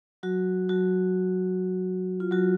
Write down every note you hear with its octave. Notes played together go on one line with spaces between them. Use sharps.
F#3 F#4
F#3 F#4
F4
F#3 F#4